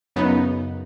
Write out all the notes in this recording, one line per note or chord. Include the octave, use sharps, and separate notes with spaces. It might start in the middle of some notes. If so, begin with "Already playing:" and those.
F#2 C#3 B3 D#4